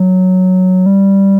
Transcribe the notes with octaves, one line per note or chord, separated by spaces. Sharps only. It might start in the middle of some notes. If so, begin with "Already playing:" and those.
Already playing: F#3
G3